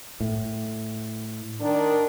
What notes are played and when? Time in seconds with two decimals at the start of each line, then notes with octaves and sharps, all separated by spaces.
0.20 A2
1.60 D#3 D4